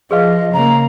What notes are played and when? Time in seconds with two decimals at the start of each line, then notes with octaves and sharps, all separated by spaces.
0.11 F3 G#4 B4 D#5 F5
0.53 C#3 A#3 A#5